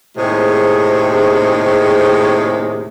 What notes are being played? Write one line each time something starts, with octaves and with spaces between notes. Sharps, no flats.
D#2 A2 C3 G#3 C4 G#4